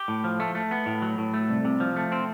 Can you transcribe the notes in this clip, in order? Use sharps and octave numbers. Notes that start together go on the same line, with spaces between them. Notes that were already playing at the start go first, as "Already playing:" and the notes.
Already playing: G4
A2
F3
A3
A3
B3
A2
F#3
A2
A3
C2
C3
F3
A3
C4